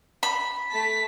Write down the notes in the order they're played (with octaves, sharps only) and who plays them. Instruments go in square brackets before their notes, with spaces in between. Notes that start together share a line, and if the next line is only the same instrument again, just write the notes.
[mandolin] B5
[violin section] A3 A5 B6